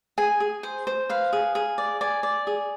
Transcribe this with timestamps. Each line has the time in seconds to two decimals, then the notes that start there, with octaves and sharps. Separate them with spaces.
0.18 G#4 G#5
0.40 G#4
0.63 C5
0.87 C5
1.09 B4 F5
1.33 G#4
1.55 G#4
1.78 D5
2.01 D5 G#5
2.23 D5
2.47 G#4